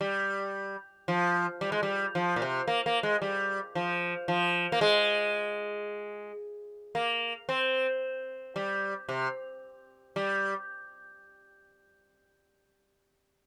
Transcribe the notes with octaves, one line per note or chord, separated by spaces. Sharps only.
G3
F3
G3
G#3
G3
F3
A#2
C3
A#3
A#3
G#3
G3
F3
F3
A#3
G#3
A#3
C4
G3
C3
G3